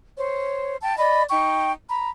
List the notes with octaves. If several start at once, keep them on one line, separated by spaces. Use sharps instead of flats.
C5 C#5
G5 A5
D5 D#5 B5
D#4 G5 C#6
A#5 B5